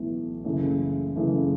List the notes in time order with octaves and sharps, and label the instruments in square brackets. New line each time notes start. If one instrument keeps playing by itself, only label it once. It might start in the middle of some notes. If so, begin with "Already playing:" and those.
Already playing: [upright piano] B1 A2 E3
F#1 F#2 C#3 E3 A3
F#1 F#2 C#3 E3 A3